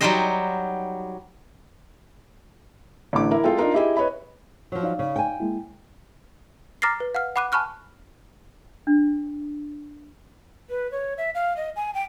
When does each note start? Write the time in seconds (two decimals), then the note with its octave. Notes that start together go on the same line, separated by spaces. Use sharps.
0.01 F#3 G3 D#4 G4 C5 D#5
3.13 A1 A2 D3 D6
3.31 E4 A#4
3.44 G#3 F4 A4 G5
3.58 D4 D#4 F4 A#4
3.73 E4 G4 G#4 D#5 E5
3.97 B4 C#5 D#5 B5
4.72 F3 F#3
4.83 D#4 D5 F5
4.99 C#3
5.16 G5 G#5
5.40 G#3 A#3 E4
6.82 A#5 D6 F6 A6 A#6 C7
7.00 B4
7.15 F5 F#5 F6
7.36 F#5 B5 D6 F#6 D#7
7.52 G#5 A5 B5 C#6 F6 F#6
8.87 D4
10.70 B4
10.91 C#5
11.18 E5
11.35 F5
11.57 D#5
11.76 G#5
11.94 G5